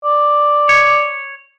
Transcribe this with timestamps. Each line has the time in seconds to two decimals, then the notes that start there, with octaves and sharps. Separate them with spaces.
0.04 D5
0.69 C#5